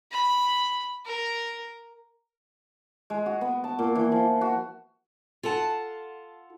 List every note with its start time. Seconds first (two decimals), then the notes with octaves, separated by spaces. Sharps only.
0.12 B5
1.05 A#4
3.10 G#3
3.26 F#4
3.41 B3
3.64 A5
3.79 A#2
3.95 E3
4.12 F3
4.41 F#4
5.43 F4 A4 F#5 A5